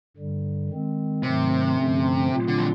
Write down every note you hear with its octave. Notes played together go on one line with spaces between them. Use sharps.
G2 D3 G3
D#3 G#3 C4
G#2 C3 D#3 F#3 A3
G2 D3 F3 A3 C#4
A#2 F#3 A3 C4 F4
D3
F3